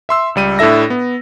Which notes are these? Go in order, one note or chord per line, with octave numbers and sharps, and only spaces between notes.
E5 C6 E6
C#2 G3 D#7
A2 D4 E4 A4 E5 A#6
B3